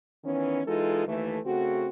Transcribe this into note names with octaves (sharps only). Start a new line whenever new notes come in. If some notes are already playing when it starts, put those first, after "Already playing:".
D#3 E3 B3 C#4
E3 G#3 D#4 F4 A4
D#2 E3 A3
C#3 A3 C4 F#4